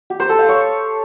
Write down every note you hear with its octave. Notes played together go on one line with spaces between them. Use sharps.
G4
C5
A4
F5
C#5